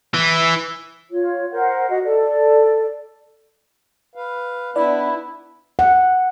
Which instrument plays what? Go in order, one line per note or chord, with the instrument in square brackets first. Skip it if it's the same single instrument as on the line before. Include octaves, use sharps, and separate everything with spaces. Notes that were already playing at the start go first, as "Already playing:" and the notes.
[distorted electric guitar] E3
[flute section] F4 C#5
A#4 C5 F#5
F#4 D#5 F#5
A4 D5
[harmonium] B4 F5
[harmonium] B3 D4 B4 [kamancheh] E4 [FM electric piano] D5
[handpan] F#5